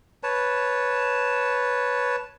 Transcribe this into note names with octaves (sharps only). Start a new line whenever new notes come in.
B4 C#5 A5